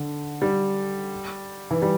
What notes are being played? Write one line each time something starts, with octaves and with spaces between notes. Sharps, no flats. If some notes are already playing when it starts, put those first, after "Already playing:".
Already playing: D3
G3
E3
G3